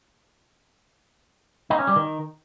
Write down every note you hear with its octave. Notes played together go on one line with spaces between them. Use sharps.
D#4
C#4
G3
D#3